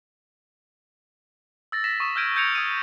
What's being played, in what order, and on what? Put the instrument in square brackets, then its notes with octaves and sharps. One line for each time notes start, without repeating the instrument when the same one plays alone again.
[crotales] E6 A6 A#6
A#6 B6 E7
C#6 D#6 E7
E6 F6 G6 G#6 D7 D#7
E6 G6 G#6 C#7 D7 F7
D#6 G#6 D7 D#7